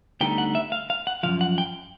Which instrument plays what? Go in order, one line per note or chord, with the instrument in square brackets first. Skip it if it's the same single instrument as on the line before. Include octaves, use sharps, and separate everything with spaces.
[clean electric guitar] D2 D3 G3 B3 D#4 G5
F#5
E5
F5
F5
F#5
C#3 F3 F5
F#2
F#5
G5